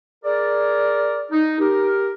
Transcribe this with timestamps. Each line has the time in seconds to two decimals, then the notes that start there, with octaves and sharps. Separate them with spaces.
0.24 G#4 A#4 D5
1.31 D#4
1.59 G4 A#4